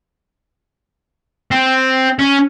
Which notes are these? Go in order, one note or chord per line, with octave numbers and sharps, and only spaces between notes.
C4
C#4